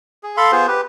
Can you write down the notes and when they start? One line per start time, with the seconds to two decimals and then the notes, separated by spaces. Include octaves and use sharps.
0.23 G#4
0.37 A4 F5 B5 C6
0.52 B3 F4 G#4 C5
0.68 G4 B4